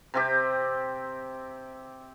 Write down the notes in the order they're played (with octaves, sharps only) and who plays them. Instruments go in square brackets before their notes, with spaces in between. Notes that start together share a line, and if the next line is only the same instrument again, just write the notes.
[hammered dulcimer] C3 C4 G4